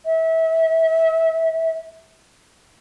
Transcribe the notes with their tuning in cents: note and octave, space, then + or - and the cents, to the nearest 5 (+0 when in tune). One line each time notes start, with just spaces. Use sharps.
E5 -25